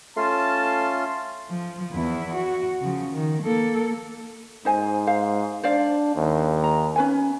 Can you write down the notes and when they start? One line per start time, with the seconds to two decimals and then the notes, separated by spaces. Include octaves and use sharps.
0.17 A3 C#4 F4 A5 C6
1.50 F3
1.92 E2 E4
2.35 F#4
2.81 C#3 F3
3.13 D#3
3.42 A#3 A4
4.65 G#2 D#4 C5 G#5
5.07 C5 F5
5.63 D4 C5 D5 F5
6.15 D#2
6.64 A#5
6.96 C#4 B4 G#5